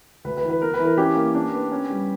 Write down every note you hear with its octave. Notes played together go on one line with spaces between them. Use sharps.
D2 B4
B4
E3
B4
B3 A#4
B4
E3
A#4
C#4 G4
A#3
D4
B3
C#4
G3